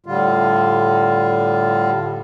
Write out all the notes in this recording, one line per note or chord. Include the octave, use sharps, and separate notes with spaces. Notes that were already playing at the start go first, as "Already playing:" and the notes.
A2 D3 G3 F4